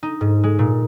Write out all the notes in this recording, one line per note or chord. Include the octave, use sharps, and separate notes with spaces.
D#4
G#2
G#3
A#2